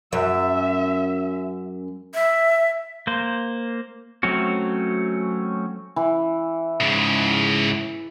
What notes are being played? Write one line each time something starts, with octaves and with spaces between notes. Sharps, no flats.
F#2 E5
E5
A#3 C5
F#3 A3 C4 C#4 F#4
E3
G#2 C#3